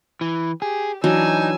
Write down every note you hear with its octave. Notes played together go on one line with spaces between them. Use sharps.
E3
G4 G#4
E3 F#3 D4 D#4 G#5 E6